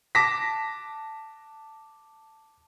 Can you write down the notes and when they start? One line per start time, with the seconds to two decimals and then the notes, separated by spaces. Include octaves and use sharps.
0.15 A5 D6 A#6 B6